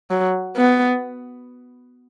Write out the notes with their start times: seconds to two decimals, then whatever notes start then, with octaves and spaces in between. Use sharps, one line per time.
0.10 F#3
0.56 B3